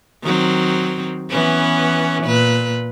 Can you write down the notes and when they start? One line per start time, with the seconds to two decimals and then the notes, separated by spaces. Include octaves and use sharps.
0.23 D#3 F#3 C4
1.29 E3 B3 C#4
2.23 A#2 B4